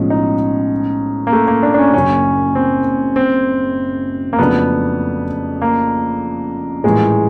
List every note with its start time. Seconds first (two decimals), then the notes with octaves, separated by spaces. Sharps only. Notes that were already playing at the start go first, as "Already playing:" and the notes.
Already playing: B1 A2 F3 G#3 C#4
0.10 D#4
1.27 A#3
1.32 A3
1.48 A#3
1.63 D4
1.74 D4
1.79 C#4
1.93 F#1 F#2 C#3 C#4
2.55 C4
3.16 C4
4.33 A#3
4.39 F2 C#3 F#3 A3 B3 D4
5.62 A#3
6.84 A#1 A2 E3 G3 G#3 A#3